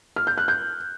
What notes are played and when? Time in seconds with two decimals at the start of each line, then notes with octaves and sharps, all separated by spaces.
0.16 F6
0.27 G6
0.38 F#6
0.48 G6